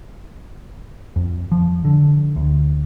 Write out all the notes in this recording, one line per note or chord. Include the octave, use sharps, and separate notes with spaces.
F2
F3
D3
D2